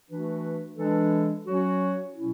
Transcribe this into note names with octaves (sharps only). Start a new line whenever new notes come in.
E3 A3 D4 F#4 B4
E3 G#3 D4 A4
F#3 C#4 F#4 C#5
B2 F#3 C#4 E4